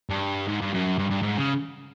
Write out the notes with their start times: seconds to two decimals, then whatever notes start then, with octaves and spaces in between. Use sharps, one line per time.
0.10 G2
0.48 G#2
0.61 G2
0.74 F#2
0.99 G2
1.10 G2
1.22 G#2
1.38 C#3